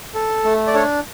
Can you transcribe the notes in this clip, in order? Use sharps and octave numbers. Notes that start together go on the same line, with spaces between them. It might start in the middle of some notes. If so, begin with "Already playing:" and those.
A4
A3
D5
D4 A4 C#5